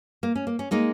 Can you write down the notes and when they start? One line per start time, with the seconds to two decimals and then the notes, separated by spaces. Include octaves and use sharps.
0.23 A#3
0.35 C#4
0.47 A#3
0.59 C#4
0.71 G#3 A#3 D#4